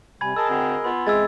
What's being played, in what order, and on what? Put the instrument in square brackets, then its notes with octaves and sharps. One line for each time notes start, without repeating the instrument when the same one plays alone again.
[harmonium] C3 G3 [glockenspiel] G#5 B5 G#6
[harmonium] G#4 A#4 D#5 [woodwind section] A5 [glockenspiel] E6
[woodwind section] D2 D3 C4
[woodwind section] B3 F4 [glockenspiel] B5
[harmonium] E2 C4 E5 [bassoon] G#3 [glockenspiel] E6 G#6 A6